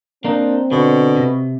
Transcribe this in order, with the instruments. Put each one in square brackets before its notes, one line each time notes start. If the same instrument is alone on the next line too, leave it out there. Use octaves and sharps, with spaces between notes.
[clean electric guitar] A#3 D4 D#4 [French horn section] C4
[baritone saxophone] B2 [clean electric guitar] D3
[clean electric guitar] C3